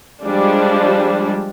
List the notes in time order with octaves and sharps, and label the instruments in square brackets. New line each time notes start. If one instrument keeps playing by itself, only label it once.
[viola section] F3 G3 G#3 D4